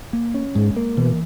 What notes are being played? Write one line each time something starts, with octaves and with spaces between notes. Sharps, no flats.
A#3
C#4
G#2 G#3
A#3
B2 E3